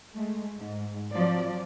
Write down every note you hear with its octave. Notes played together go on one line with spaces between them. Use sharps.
G#3 A3
G#2
F3 F#3 C4 D5